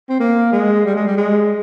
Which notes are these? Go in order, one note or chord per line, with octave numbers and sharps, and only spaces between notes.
C4
A#3
G#3
G3
G#3
G3
G#3